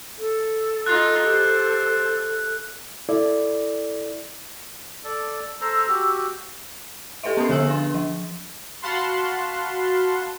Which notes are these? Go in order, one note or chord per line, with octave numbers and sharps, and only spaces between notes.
A4
D#4 F4 F#6
G4 C5
E4 A4 D5
A4 D5
A4 C5 A#5 E6
F#4 G4
G4 A4 B4 D#5 E5
B3 C#4 A4 D#6 C7
D3 F3 G#4 G#5 E6 F#7
D4 G#4 C6
F3
F#4 F5 F#5 A5 B5 C6